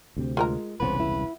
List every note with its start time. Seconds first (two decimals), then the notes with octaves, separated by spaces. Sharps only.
0.17 D2 C3 C4
0.37 G#3 F4 A#4 A#5
0.80 E1 C2 C#3 E3 B3 B4 C5
1.00 E4